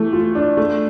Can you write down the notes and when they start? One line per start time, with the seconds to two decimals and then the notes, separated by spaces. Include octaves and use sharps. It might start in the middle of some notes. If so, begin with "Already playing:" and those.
Already playing: E3 A3
0.13 F4
0.35 D4
0.57 A3